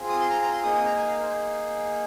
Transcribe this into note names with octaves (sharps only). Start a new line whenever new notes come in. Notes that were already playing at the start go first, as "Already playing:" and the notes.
Already playing: C4 F4 G#4
D#6
C6
A#5
A#5
C6
A#3 D#4 G#4 D#6
D#6
A#5
G#5
F5
A#4
C5